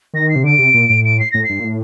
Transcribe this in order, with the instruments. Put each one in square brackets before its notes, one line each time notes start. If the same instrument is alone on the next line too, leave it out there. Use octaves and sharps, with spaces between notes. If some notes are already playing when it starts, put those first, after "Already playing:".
[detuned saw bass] D#3 [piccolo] A#6
[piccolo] C7
[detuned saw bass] C3
[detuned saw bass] D3 [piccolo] D7
[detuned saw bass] C3
A#2
A2
[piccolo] D7
C7
[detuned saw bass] A2 [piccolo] A#6
[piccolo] C7
[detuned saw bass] G2
A#2
A2